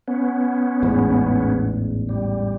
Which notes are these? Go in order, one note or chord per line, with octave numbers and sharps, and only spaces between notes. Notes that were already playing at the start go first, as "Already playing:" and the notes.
B3 C#4
A1 E2 G#2
G3